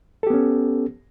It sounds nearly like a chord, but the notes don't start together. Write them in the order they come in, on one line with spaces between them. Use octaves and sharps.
A4 G4 B3 C#4